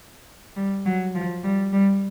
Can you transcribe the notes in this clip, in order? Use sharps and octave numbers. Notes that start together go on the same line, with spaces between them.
G3
F#3
F3
G3
G3